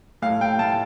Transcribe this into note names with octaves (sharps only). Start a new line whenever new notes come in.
A2 F5
A2 G5
A2 A5